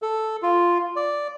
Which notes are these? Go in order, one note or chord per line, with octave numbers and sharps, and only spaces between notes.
A4
F4
D5